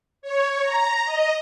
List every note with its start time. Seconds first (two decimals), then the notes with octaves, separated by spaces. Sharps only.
0.22 C#5
0.63 A#5
1.05 D#5